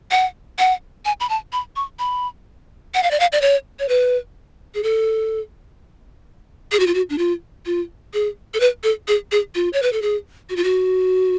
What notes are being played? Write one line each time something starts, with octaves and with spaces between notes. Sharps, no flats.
F#5
F#5
G#5
B5
A5
B5
C#6
B5
F#5
F5
D5
F5
D5
C#5
C#5
B4
G#4
A4
G#4
F#4
F4
F#4
D4
F4
F4
G#4
A4
B4
A4
G#4
G#4
F4
C#5
B4
A4
G#4
F#4
F4
F#4